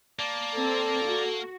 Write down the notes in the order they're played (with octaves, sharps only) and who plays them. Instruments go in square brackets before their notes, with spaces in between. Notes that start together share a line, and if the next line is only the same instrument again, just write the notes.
[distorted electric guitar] A#3 [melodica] D5 A5
[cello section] C4 [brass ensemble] A4
[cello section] F#4